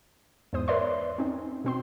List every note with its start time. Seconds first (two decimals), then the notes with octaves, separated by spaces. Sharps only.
0.53 E2 G#2 C5 D#6
0.68 A#4 B4 C#5 D5 E5 C6
1.18 C4 C#4 D#4
1.64 B2 C4 C6